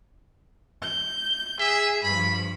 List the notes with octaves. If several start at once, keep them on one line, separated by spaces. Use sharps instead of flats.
G6
G#4 E5
G2 F3 B5